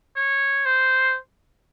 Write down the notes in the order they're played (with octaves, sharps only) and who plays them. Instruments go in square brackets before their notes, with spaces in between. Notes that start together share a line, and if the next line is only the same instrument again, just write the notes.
[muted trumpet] C#5
C5